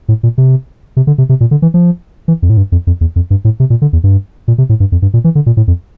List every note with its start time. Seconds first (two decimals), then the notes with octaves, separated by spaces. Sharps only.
0.08 A2
0.23 A#2
0.38 C3
0.97 C3
1.07 D3
1.18 C3
1.29 C3
1.41 A#2
1.51 D3
1.62 E3
1.74 F3
2.28 E3
2.42 F2
2.50 A2
2.57 G2
2.72 F2
2.87 F2
3.01 E2
3.16 F2
3.30 G2
3.45 A2
3.60 C3
3.70 A#2
3.82 D3
3.93 E2
4.04 G2
4.48 A#2
4.58 C3
4.69 A2
4.80 G2
4.92 F2
5.02 G2
5.14 A#2
5.24 E3
5.35 D3
5.46 A#2
5.57 A2
5.68 F2